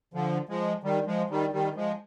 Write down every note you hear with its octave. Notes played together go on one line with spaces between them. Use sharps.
D3 F3
F3 G#3
D#3 G3
F3 G#3
D#3 G3
D#3 G3
F3 G#3